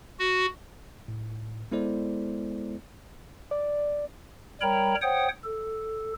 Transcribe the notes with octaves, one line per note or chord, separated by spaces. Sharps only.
F#4
A2
G#3 B3 E4 A4 C5 D5
D5
G3 A#4 C#5 G5 A#5 B5
C5 C#5 F#5 G5 D#6
A4